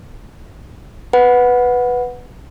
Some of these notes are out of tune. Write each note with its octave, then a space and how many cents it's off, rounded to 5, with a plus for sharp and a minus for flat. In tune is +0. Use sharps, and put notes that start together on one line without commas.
B4 +0 F#5 -10